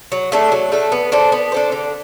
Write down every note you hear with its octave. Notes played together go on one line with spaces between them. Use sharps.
F#3
A3 D4 A4
F#3
A3 D4 A4
B3
D4 A4 C5
B3
D4 A4 C5
D3